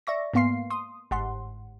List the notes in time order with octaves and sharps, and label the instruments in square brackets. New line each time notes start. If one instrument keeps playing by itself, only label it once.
[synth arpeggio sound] D5 E5 C#6 A#6
G#2 A#3 B3 F5 C6 C7
C6 D#6
G1 G#2 F#5 C6